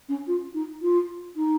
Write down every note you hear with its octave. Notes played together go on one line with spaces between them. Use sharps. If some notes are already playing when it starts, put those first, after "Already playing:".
C#4
F4
D#4
F4
D#4